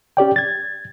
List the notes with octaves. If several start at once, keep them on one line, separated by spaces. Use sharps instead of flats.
C#4 G4 D5 G5
G#6 A6